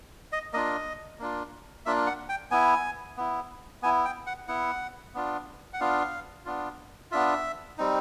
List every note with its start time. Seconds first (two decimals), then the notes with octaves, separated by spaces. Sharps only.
0.32 D#5
0.53 A#3 D4 F4 D#5
1.19 A#3 D4 F4
1.86 A#3 D4 F4 E5
2.07 F#5
2.29 G5
2.51 B3 E4 G#5
3.17 B3 E4
3.82 B3 E4 G#5
4.05 G5
4.27 F#5
4.48 B3 E4 F#5
5.14 B3 D4 F4
5.73 F#5
5.80 B3 D4 F4 F5
6.46 B3 D4 F4
7.11 B3 D4 F4 E5
7.78 G3 C4 D#4